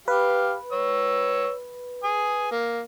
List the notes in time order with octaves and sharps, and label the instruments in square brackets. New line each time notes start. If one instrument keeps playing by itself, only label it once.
[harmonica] G4 F5 [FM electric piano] B4
[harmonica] C#5 E6
G#5 D#6
A#3